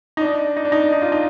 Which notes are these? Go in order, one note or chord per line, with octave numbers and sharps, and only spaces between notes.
D#4
D4
D#4
D4
D#4
D#4
F4
D#4